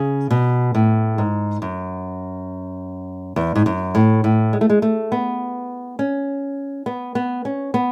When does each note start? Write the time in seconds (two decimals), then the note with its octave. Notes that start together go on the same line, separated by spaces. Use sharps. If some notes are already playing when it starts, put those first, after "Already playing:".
Already playing: C#3
0.31 B2
0.75 A2
1.18 G#2
1.62 F#2
3.36 E2
3.55 G#2
3.66 F#2
3.95 A2
4.24 A2
4.53 G#3
4.61 A3
4.70 G#3
4.82 A3
5.12 B3
5.99 C#4
6.86 B3
7.15 B3
7.45 C#4
7.74 B3